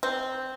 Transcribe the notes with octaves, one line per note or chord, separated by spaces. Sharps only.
C4